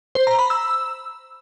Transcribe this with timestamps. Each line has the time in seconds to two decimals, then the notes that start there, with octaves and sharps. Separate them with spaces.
0.15 C5
0.27 A#5
0.39 B5
0.50 E6